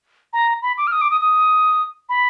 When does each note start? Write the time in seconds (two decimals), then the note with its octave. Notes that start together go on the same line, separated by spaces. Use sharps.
0.33 A#5
0.62 B5
0.78 D6
0.87 F6
0.92 D#6
1.01 D6
1.11 D#6
1.21 D#6
2.09 B5